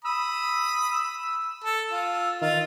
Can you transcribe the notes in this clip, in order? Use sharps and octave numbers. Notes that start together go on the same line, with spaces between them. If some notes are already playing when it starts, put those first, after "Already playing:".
B5 D#6 E6
E6
A4
F4
D#3 F4